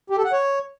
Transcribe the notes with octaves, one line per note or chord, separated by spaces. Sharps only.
G4
A4
F#5
C#5